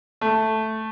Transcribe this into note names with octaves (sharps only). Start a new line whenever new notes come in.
A3